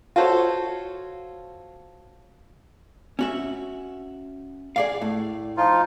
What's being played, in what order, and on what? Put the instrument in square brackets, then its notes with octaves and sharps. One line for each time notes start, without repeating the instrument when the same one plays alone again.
[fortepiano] F4 F#4 A4 C5 C#5
[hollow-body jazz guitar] C#4 F#4 E5
G#4 D5 F5
A2
[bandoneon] F3 D#4 F4